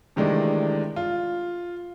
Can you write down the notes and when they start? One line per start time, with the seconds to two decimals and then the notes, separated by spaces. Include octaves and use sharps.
0.16 C3 D#3 E3 G#3 A3 D4
0.96 F4